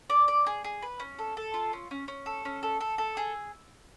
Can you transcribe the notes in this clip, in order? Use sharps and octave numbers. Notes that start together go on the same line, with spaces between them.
D5
D5
G#4
G#4
B4
C#4
A4
A4
F4
C#4
C#4
C#4
A4
C#4
A4
A4
A4
G#4